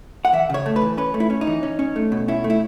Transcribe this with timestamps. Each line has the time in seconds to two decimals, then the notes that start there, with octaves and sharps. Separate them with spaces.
0.25 F#5
0.33 E3 E5
0.50 C#3 C#5
0.66 A3
0.76 B4
0.82 E3
0.98 C#4 B4
1.14 A3
1.20 E4
1.30 C#4
1.41 D#4
1.47 E3
1.63 C#4
1.79 C#4
1.96 A3
2.12 B2
2.28 C#4 E4
2.44 A3
2.50 E4